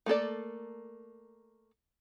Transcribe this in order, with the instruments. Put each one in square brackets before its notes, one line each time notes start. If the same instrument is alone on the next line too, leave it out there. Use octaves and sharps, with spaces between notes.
[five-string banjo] A3 A#3 A4 D5